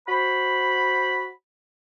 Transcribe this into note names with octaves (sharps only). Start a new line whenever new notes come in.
F#4 C5 B5